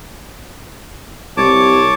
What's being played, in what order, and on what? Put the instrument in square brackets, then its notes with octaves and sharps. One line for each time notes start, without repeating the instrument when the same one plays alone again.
[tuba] C2 [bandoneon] C#5 A5 D6